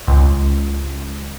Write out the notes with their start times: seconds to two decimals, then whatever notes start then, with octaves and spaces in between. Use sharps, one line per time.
0.07 C#2